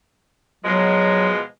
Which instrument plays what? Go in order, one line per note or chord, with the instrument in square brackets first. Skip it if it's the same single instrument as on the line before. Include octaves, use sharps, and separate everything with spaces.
[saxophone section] B2 F3 G#3 [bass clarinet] F#3